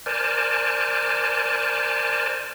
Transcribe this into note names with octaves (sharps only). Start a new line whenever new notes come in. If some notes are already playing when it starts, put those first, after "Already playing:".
A#4 C5 D5 G#5 A5